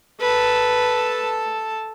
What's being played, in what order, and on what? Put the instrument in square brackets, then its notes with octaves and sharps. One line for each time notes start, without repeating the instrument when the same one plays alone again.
[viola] A4 A5 [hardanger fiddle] B4